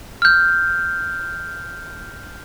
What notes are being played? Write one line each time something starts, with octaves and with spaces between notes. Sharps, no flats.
F6 G6